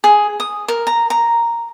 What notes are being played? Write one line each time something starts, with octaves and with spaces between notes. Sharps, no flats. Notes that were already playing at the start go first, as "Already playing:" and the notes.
G#4
D#6
A#4
A#5
A#5